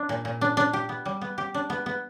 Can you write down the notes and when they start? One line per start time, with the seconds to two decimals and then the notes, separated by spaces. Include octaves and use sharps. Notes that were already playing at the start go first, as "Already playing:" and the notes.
Already playing: D4
0.09 A#2
0.25 A#2
0.41 D4
0.57 D4
0.73 G4
0.89 B3
1.06 G3
1.21 B3
1.38 G4
1.54 D4
1.70 B3
1.86 B3